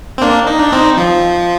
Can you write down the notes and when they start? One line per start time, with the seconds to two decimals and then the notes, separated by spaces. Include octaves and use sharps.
0.18 C4
0.21 A#3 D4
0.47 D#4
0.59 D4
0.72 C4 D#4
0.97 F3